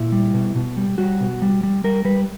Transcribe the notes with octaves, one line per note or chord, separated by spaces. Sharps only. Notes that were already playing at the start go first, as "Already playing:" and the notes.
Already playing: A#2 E4
G3
B2
B2
G3
G3 F#4
B2
G3
G3
G3 A#4
G3 B4